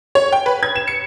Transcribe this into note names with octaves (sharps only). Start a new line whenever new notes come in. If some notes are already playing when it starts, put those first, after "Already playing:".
C#5
G5
B4
G#6
E7
C#7